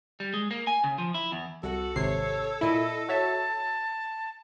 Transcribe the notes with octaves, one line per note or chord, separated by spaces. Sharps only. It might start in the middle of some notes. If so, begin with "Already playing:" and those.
G3
G#3
A#3
G#5
C#3
F3
E4
E2
C2 F#4 A4
G#1 C3 C#5 C7
A#2 E4 D#5
F#4 C#5 E5 A5